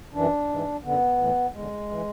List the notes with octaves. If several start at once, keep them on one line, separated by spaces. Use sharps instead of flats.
F#2 E3 D4
G#2 E3
F#2 D3 B3
A2 E3
E2 D3 G#3
E3